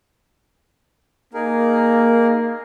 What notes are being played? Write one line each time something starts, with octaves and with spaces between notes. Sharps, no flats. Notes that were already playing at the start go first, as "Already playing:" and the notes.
A#3 D#4 G#4 A#4